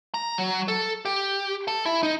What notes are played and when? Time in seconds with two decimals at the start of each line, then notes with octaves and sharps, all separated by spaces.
0.14 A#5
0.38 F#3
0.68 A4
1.05 G4
1.68 A4
1.85 E4
2.03 D#4